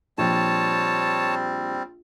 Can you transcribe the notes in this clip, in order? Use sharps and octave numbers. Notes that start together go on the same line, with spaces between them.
A#1 G3 C4 C#5 A5